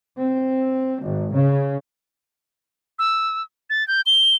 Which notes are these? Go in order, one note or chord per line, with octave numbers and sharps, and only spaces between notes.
C4
G#1
C#3
E6
A6
G6
G7